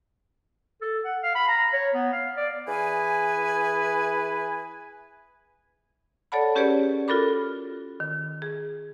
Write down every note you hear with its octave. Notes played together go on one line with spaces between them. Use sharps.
A4
F#5
F5
B5
A#5
C#5
B3
F5
D5
E3 G#4 B4 G#5
A4 C#5 D5 F#5 A5 B5
C#4 G4 G#4 B4 C#5 D5
F4 F#4 A4 A#4 B5 D6
D#3
G#4